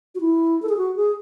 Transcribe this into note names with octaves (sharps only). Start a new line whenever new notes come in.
F#4
E4
A4
G#4
F#4
G#4